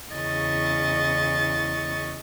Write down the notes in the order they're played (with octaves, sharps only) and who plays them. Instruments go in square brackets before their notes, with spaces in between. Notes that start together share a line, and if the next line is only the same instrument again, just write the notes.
[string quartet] E2 C#3 E4 D#5 C#6 A6